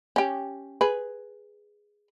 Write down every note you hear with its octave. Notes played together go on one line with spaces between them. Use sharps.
C#4 G4
G#4 B4